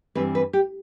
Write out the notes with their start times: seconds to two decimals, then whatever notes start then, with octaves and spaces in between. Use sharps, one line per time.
0.15 G2 E3 G3 C4 B4
0.35 B4
0.53 G4